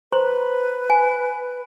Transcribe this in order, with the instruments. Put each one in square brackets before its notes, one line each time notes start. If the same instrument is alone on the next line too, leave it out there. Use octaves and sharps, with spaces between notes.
[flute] B4 [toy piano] C5 A#5 C6
[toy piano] G#5